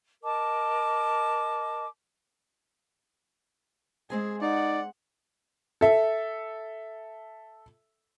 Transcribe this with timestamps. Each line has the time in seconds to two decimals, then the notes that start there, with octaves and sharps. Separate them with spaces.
0.23 A#4 D#5 A5 D6
4.10 G#3 C4 G#4 G#5
4.42 D#4 D5 F#5
5.81 A4 E5